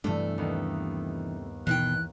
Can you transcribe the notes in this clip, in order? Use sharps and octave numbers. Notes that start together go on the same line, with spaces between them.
G2 C3 E3 A3 D4
D#2 B3 D#5
B2 D#3 E3 G5 F#6